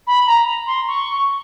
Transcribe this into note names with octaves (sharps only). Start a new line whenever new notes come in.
B5
A#5
C6
C#6